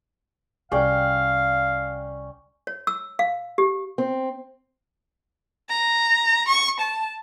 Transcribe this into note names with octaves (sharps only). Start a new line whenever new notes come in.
C2 C#4 D5 F5 G5
C#5
E6
F5
G4
C4
A#5
C#6
A5